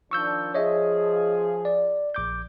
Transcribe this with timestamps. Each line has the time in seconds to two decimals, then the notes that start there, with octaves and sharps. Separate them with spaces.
0.11 D#3 F3 D4 C#6 E6 G6
0.54 F3 G#4 C#5 D#5 E5
1.65 D5
2.15 A#1 D6 G6